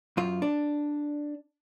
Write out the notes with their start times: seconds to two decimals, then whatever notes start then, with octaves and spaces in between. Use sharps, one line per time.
0.17 F#2 F4
0.42 D4